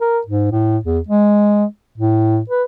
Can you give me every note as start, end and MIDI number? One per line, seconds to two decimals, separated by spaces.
0.01 0.19 70
0.27 0.51 44
0.52 0.78 45
0.85 0.99 40
1.08 1.65 56
1.98 2.40 45
2.50 2.64 71